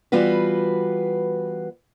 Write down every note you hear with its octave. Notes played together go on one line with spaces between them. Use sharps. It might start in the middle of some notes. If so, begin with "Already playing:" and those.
E3 G3 B3 F4 F#4 B4